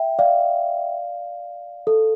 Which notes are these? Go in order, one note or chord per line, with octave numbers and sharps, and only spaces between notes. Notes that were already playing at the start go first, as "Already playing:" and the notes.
Already playing: E5 G5
D5 F5
A4